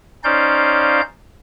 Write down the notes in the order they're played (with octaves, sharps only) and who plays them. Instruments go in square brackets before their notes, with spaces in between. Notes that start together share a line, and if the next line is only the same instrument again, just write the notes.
[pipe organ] C#4 D#4 C5 D5 F5 G6